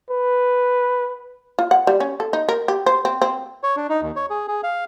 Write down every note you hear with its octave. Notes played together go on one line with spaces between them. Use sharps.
B4
F4
F#5
G3
C#4
A4
D#4
A#4
G4
C5
C4
C4
C#5
D4
D#4
D#2
C#5
G#4
G#4
F5